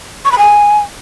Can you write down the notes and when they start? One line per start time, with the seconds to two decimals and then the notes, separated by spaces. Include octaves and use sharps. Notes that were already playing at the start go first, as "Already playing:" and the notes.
0.25 C#6
0.32 B5
0.38 G#5